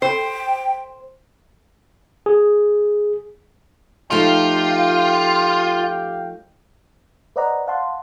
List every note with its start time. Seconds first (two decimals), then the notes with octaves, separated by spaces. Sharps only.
0.02 C5 G5
2.26 G#4
4.11 F3 A3 D#4 F4 G4 F5 G5
7.36 B4 C5 D5 D#5 F#5 A#5
7.67 F5 F#5 A5 C6